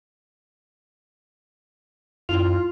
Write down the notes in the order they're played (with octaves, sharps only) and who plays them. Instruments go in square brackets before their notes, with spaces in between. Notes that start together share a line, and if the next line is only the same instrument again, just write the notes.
[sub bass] F#2 [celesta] E4 F7 [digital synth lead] F4